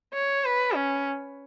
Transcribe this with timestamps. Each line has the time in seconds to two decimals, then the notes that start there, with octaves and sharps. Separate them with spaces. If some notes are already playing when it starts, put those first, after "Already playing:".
0.14 C#5
0.45 B4
0.75 C#4